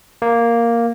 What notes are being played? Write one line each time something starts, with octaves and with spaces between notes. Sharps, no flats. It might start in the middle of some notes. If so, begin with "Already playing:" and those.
A#3